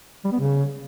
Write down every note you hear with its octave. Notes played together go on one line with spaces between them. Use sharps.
G3
B3
C#3